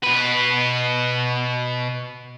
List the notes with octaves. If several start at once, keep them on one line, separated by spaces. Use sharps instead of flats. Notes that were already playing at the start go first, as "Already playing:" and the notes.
B2 B4